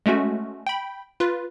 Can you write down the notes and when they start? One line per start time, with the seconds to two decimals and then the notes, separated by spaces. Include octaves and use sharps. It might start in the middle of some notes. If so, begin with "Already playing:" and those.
0.06 G#3 A3 C#4 F#4
0.67 G5 B5
1.20 F4 B4